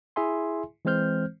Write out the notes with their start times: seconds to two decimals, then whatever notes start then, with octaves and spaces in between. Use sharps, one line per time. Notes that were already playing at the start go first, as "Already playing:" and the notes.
0.16 E4 G#4 E5 G#5 C6
0.85 E3 G#3 C4 C5 F6 G6